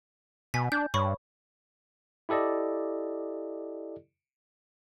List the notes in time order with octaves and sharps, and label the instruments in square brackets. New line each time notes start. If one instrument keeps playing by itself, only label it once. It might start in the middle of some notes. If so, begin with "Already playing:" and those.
[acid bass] B2 [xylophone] G#5 B6
[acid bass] D4 [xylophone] G6
[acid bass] G2 [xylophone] C#5 B5 C#6
[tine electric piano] E4 G4 A4 D5 D#5